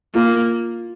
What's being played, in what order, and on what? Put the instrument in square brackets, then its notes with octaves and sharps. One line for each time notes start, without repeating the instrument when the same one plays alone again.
[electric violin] A#3 [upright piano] F4